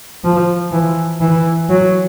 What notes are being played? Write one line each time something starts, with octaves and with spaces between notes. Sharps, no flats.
F3
E3
E3
F#3